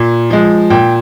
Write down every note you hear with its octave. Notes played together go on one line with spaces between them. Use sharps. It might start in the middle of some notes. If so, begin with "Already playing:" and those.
Already playing: A#2
F3 G#3
A#2 G5